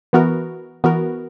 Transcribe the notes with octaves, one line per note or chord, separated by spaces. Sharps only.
E3 B3 F#4 A#4
E3 B3 F#4 A#4